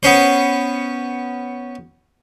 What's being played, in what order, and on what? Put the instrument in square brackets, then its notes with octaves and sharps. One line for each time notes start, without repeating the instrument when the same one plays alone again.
[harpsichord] B3 C#4 C5